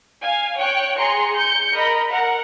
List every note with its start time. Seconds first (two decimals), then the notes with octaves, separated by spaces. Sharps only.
0.23 F5 G#5
0.59 C#5 G5 F#6
0.97 G#4 A#5 C6 C#7
1.37 G6 C#7
1.73 A#4 D#5 B5
2.11 A#4 F#5